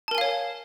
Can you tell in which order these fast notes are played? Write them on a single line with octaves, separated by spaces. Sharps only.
A5 A#4 G#5 F5 C#5